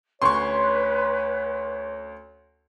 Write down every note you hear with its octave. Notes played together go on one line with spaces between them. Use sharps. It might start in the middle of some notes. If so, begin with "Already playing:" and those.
D2 C#4 B4 C#5 C6 C#6